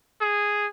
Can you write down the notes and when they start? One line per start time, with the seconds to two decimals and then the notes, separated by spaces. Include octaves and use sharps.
0.21 G#4